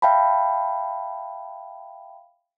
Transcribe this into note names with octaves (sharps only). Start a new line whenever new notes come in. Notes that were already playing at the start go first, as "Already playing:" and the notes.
E5 F5 G5 A5 B5